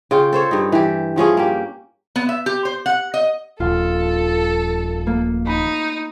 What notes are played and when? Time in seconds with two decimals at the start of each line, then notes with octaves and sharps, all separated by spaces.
0.11 C#3 F4 G5
0.33 A4 C5 C#5
0.51 G2 D#4
0.72 E3 G4
1.16 G2 F3 C#4 G#4
1.37 A#3 G4
2.16 B3
2.29 E5
2.46 G4
2.65 C5
2.86 F#5
3.14 D#5
3.60 D#1 A#1 F4 A4
5.07 A#3
5.47 D#4 B5